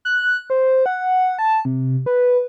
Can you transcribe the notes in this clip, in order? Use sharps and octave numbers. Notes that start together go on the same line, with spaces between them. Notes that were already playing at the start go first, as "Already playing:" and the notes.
F#6
C5
F#5
A5
C3
B4